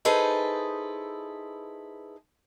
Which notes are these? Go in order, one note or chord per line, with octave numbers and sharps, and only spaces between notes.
D#4 E4 G#4 A4 B4 C5